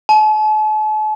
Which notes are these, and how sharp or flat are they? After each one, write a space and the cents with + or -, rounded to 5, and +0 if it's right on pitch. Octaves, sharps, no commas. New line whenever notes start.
A5 -45